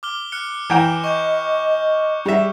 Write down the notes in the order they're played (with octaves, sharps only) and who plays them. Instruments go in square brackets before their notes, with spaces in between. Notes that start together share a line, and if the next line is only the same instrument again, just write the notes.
[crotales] D6 F6 G7
F6 F#6 C#7
[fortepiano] E3 G5 A#5 [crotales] E7
[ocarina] D#5 [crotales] C#6 G6
[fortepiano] G3 E5 [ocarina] G#4